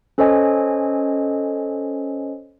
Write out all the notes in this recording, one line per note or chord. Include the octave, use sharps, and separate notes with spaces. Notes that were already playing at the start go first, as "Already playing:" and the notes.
C#4 A4 C5 C#5 D#5 G#5